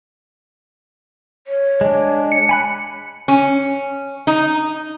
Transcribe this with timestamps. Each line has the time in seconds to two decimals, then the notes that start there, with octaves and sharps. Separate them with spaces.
1.47 C#5
1.81 G#3 D4
2.32 C#7
2.49 G#5 B5 F#6
3.28 C#4
4.27 D#4